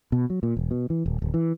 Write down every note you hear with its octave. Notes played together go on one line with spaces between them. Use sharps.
B2
F#3
A#2
E1
B2
E3
D#1
D1
E3